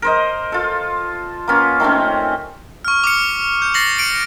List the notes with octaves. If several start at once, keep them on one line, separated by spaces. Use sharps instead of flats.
A#4 C5 D#5
F4 A4
A#3 B3 C#4 F4
D#3 A3 C4 C#4
C#6 F6
D6 F6 C#7
G6
A6 A#6 C7 F#7
C#7 D7 F#7